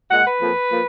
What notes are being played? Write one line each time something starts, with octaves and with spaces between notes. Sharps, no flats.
A#2 G#3 F#5
B4
F2 F3 A#3
F3 A#3